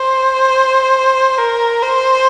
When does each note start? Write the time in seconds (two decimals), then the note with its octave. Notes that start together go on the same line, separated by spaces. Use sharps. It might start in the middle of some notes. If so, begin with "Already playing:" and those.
Already playing: C5
1.39 A#4
1.82 C5